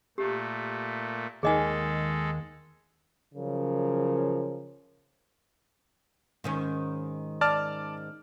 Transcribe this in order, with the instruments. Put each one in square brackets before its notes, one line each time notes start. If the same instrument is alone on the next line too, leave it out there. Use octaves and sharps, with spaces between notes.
[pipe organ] A#2 A3 [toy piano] G4
[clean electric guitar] D#2 D#3 [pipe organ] G#3 A4 [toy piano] G#4 D#5 G#5
[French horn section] C#3 F3 F#3 A#4
[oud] G#2 D#3 C#4
[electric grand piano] D5 A5 F6